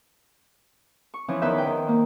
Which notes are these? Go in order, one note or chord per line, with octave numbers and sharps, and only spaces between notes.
C#6
E3 F3 C#4 E4
E2 D#3 B4 E5 G6
C5 G5
D#3
A#3